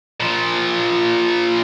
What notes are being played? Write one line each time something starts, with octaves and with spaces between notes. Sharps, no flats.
A#2 F3